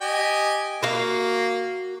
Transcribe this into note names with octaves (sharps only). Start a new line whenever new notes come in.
G4 D#5 G#5
A#3 F#4 F5